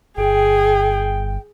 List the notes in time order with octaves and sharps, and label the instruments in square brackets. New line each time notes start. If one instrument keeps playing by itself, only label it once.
[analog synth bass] G1 [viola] G#4 [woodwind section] G5